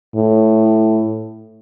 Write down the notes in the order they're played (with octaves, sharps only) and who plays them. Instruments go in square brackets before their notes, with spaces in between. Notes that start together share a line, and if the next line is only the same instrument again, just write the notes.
[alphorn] A2